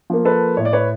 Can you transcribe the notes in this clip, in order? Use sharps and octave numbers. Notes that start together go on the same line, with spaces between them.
F3 A#3
A4 B4
A2 C#5
D5
B4 C#5